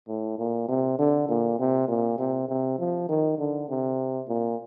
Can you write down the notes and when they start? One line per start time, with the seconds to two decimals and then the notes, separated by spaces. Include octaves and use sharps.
0.08 A2
0.38 A#2
0.68 C3
0.99 D3
1.28 A#2
1.59 C3
1.88 A#2
2.19 C3
2.48 C3
2.78 F3
3.09 D#3
3.38 D3
3.69 C3
4.28 A#2